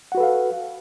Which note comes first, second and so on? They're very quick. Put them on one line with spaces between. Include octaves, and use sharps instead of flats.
F#5 F#4 B4 A4 F5